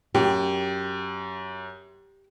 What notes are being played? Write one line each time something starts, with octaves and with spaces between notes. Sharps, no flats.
F#2 G4